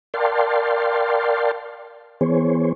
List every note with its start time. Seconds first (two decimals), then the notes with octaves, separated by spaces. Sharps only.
0.14 A#4 D5 F5 G5 A5 C6
2.21 E3 B3 G#4 C5 C#5